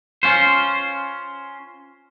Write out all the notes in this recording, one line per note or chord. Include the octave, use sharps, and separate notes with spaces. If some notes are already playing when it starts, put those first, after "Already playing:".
C#4 F4 C5